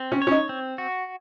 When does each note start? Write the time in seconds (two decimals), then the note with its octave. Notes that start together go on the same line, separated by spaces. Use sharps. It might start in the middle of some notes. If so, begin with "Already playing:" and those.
Already playing: C4
0.12 C#4
0.22 C#5
0.27 C#4
0.31 D#4
0.49 C4
0.78 F#4